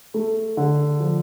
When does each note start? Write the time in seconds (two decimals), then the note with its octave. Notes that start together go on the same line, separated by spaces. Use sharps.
0.14 A3
0.57 D3
1.00 F3